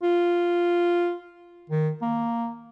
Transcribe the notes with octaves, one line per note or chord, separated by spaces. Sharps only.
F4
D#3
A#3